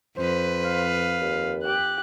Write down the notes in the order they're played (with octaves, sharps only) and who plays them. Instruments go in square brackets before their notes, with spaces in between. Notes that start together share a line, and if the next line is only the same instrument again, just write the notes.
[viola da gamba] F2 B4 [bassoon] C5
[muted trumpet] F5
[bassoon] D#2
[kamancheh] G4 F#6